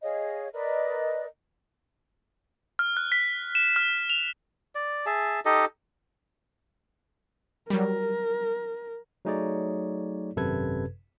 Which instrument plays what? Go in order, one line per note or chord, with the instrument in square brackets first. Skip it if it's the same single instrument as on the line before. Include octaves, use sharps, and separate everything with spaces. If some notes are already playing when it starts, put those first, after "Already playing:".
[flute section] G#4 C#5 D#5 F5
A#4 B4 D5 D#5
[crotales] F6
F#6
B6
E7
F6
F7
[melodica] D5
G#4 E5 A5
D#4 G4 A4 D#5
[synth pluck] F#3 G3 [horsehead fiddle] A#4
[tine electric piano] F#3 A3 D#4 G#4 C#5 D5
G#1 F#2 C3 A4 B4 G#6